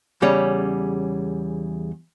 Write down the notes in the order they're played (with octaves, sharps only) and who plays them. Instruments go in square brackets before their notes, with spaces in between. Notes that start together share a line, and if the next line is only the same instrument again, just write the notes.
[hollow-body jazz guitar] E2 C#3 G3 C#4